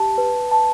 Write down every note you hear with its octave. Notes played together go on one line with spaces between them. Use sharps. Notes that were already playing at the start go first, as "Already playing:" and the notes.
Already playing: G4 A5
B4
A5